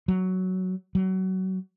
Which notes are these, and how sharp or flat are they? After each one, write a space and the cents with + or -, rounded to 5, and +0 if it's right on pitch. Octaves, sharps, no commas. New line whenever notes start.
F#3 +5
F#3 +25